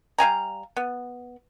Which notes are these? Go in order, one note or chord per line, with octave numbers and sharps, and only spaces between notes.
G3 F5 G#5 A#5
B3